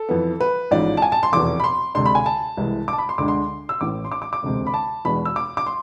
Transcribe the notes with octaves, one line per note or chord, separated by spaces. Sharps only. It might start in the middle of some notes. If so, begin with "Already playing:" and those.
Already playing: A4
F2 E3 B3
B4
A1 G#2 F3 D5
A5
G#5
A5
C6
F1 E2 B2 D6
B5
C6
D2 C3 G#3 D4 C6
B5
G#5
A5
C2 C3 E3 G#3
A5 D6
B5
C6
D2 D3 G#3 D4 D6
C6
E6
A1 A2 E3 D6
C6
D6
D6
D6
E1 D2 C3 G#3 C4
B5
A5
E2 B2 G#3 D4 B5
E6
D6
D6
C6